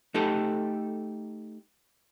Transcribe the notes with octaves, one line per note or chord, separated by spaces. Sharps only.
A3 D#4 G4 A4